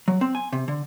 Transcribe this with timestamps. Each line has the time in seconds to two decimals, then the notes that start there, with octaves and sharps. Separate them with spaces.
0.08 F#3
0.21 C4
0.35 G#5
0.53 C3
0.68 D3